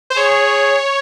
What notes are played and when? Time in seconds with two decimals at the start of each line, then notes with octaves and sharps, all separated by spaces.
0.10 C5
0.16 G#4 C#5